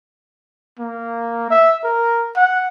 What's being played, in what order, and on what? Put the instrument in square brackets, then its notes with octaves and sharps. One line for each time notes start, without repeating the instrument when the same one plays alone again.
[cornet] A#3
E5
A#4
F#5